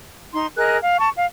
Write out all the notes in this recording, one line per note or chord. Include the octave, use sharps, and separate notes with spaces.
D#4 C6
G#4 A#4 D#5 F#6
F5
A5 C#6
F5